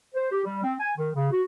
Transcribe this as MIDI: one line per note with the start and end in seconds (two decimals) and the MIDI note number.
0.14 0.29 72
0.32 0.41 67
0.45 0.64 55
0.64 0.74 60
0.80 0.91 80
0.98 1.10 51
1.16 1.29 49
1.31 1.42 66